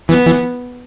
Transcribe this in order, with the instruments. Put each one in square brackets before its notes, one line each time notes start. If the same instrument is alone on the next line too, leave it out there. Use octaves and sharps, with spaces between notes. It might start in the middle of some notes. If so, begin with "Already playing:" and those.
[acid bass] E3 [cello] B3
[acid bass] E3